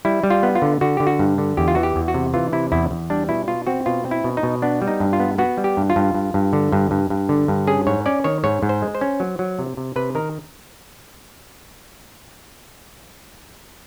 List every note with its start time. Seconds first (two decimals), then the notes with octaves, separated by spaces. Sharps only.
0.05 G3 E4
0.24 G3
0.30 F4
0.43 B3
0.55 F4
0.62 D3
0.81 D3 F#4
0.97 D3 G4
1.07 F#4
1.19 G2
1.38 D3
1.57 E2 G4
1.68 F4
1.75 E3 F#4
1.83 G4
1.96 E2
2.08 F#4
2.14 C3
2.34 E3 F4
2.52 C3 E4
2.72 E2 E4
2.91 E2
3.10 G3 D4
3.29 B2 E4
3.48 B2 F4
3.67 C4 F#4
3.86 B2 F4
4.05 C4
4.11 E4
4.24 B2
4.37 D#4
4.43 B2
4.62 B3 D4
4.82 G3
4.88 D#4
5.00 G2
5.13 F4
5.20 B3
5.38 B3 F#4
5.57 G3
5.64 G4
5.77 G2
5.90 F4
5.96 G2
6.14 G2
6.34 G2
6.53 D3
6.72 G2
6.91 G2
7.10 G2
7.29 D3
7.48 G2
7.67 C#4 G#4
7.87 G#2 C#5
8.06 C#4 D5
8.24 D#3 C#5
8.44 G#2 C#5
8.63 G#2
8.69 C5
8.82 G#3
8.95 C5
9.01 C#4
9.20 F#3
9.39 F#3
9.59 C3
9.77 C3
9.96 C3 B4
10.15 D#3 A#4